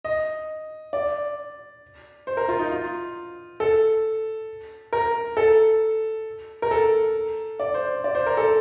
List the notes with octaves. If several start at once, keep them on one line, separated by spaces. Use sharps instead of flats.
D#5
D5
C5
A#4
F4
D#4
F4
A4
A#4
A4
A#4
A4
D5
C5
D5
C5
A#4
A4